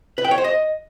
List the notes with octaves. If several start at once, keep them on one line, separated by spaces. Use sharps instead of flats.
B4
G5
C#5
C5
D#5